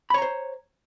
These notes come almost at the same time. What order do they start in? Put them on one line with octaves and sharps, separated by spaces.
B5 C#5 A#5 C5